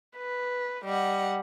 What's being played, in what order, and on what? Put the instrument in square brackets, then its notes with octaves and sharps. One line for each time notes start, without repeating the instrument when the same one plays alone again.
[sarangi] B4
[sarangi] G3 [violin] D#5 F#5